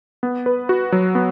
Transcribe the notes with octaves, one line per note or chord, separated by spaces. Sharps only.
B3
B4
F#4
F#3
B3